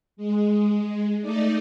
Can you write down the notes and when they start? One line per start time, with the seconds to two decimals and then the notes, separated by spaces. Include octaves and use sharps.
0.17 G#3
1.21 A3 D#4 D5